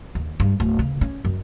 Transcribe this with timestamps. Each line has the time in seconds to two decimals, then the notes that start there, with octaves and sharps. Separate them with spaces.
0.15 D#2
0.40 G2
0.60 D1
0.79 C#3
1.01 C#4
1.25 F#2